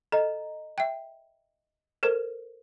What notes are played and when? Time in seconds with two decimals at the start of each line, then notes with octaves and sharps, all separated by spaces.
0.12 A4 D#5 A#5
0.78 E5 G5
2.03 A4 A#4 C5